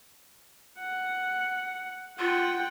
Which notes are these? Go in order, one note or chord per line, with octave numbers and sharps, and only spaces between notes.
F#5
F4 F#5 G5